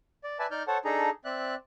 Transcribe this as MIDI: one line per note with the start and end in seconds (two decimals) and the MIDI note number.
0.24 0.39 74
0.39 0.46 71
0.39 0.46 74
0.39 0.46 76
0.39 0.46 80
0.39 0.46 81
0.51 0.63 63
0.51 0.63 74
0.51 0.63 89
0.51 0.63 91
0.68 0.78 69
0.68 0.78 72
0.68 0.78 73
0.68 0.78 78
0.68 0.78 81
0.85 1.10 62
0.85 1.10 63
0.85 1.10 68
0.85 1.10 69
0.85 1.10 82
1.25 1.55 60
1.25 1.55 74
1.25 1.55 76
1.25 1.55 90